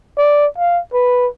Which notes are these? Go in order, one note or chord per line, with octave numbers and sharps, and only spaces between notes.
D5
F5
B4